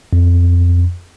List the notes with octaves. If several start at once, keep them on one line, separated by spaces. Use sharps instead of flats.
F2